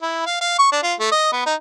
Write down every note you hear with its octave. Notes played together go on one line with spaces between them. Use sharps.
E4
F5
F5
C#6
D4
F4
A3
D#5
B3
D#4